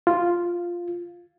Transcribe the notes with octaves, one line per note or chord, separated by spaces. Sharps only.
F4